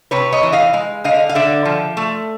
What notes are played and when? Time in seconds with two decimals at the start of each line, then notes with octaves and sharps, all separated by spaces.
0.11 C3 B4 C#5
0.32 C#5 D#5
0.43 E3
0.52 D#5 F5
0.73 G#3
1.04 D3 D#5 F5
1.29 F5
1.35 D3 D5 E5
1.65 F3
1.97 A3